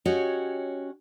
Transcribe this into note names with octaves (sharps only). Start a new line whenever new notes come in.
C#4 F#4 G4 C#5 D#5